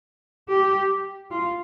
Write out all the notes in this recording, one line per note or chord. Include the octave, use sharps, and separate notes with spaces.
G4
F4